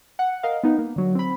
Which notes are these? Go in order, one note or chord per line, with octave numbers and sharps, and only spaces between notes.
F#5
A#4 D#5 F5
B3 D#4
A#3
D3 F#3
C4 B5